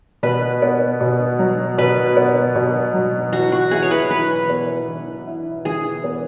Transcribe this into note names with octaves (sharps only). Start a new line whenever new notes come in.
B2 B4
B3
B2
F#3
B2 B4
B3
B2
F#3
E3 F#4
F#4
E4 G#4
C#5
B4
E3 B4
B3
E3
E4
E3 G#4
B3